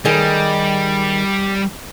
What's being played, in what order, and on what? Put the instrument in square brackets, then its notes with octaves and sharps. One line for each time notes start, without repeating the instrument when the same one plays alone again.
[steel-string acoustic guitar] D#3 G#4 D#5 [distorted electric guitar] G3